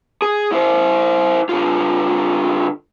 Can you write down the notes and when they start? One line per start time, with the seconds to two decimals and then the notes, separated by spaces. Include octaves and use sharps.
0.22 G#4
0.52 E4 C5
1.49 D3 F4